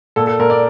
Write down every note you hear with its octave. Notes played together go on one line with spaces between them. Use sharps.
A#2 A4
A4
A#2 A#4
D5